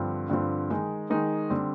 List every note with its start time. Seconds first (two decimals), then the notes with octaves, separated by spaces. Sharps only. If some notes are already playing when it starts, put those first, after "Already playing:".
Already playing: G2 D3 F3 C4
0.29 G2 D3 F3 C4
0.70 D#3 G#3 D#4
1.10 D#3 G#3 D#4
1.50 D3 G3 C4